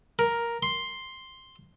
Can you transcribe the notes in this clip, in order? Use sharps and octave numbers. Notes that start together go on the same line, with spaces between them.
A#4
C6